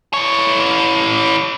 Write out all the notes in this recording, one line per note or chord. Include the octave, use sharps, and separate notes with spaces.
E3 C#5